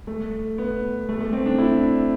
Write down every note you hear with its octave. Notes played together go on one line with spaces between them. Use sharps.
A3
B3
A3
A3
C4
D4
E4